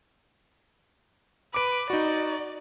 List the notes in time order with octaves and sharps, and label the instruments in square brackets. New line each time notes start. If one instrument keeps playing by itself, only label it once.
[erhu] B4 [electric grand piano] D6 D7
[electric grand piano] D#4 F#4 [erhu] D5